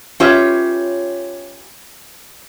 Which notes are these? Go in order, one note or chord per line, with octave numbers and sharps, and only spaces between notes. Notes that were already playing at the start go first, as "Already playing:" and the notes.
C#4 F4 G4 B4 C#5 E5